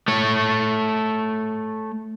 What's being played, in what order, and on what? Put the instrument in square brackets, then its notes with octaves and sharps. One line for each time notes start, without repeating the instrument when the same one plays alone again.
[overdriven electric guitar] A3 C#5